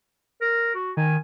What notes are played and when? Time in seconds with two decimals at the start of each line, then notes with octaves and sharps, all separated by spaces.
0.41 A#4
0.75 F#4
0.97 D#3 G#5